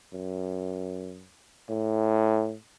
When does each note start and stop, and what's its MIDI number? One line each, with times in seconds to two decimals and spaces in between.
0.13 1.26 42
1.70 2.55 45